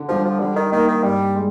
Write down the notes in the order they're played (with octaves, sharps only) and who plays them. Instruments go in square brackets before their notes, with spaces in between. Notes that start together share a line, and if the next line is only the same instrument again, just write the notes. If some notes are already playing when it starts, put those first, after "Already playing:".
Already playing: [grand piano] D3
[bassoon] F3 [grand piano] G3 D4 G4
[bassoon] F3
[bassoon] D3 [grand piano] G3
[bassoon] D#3
[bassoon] D#3 [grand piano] A#3 D#4 A#4
[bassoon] D#3
[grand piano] G2 [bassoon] G3
[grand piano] G#3